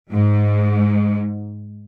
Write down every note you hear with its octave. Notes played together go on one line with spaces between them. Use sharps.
G#2